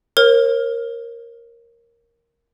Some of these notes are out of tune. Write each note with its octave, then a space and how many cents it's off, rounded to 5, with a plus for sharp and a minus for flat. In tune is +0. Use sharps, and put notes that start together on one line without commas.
A#4 +0 C#5 -45